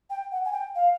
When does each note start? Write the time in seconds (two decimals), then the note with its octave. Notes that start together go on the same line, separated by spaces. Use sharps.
0.09 G5
0.31 F#5
0.45 G#5
0.52 G5
0.75 F5